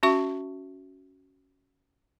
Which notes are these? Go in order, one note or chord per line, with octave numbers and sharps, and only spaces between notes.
C#4 F#4 E5 C#6